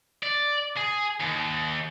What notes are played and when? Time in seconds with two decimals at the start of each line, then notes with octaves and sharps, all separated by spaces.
0.23 D5
0.77 G#4
1.20 D#2